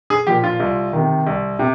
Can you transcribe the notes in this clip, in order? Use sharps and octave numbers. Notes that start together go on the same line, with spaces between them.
G#4
A#2 F3 G4
F4
C2
C3 D#3
C2
C3